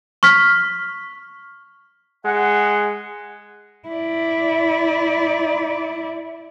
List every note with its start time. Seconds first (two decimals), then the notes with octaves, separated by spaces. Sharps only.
0.23 C#6 F6 B6
2.25 G#3 F#5
3.89 E4 D5